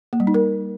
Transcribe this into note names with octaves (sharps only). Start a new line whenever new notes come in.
A#3
G3
D#4
A#4